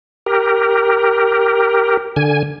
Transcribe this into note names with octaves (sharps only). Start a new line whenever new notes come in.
G4 A#4
D3 G#5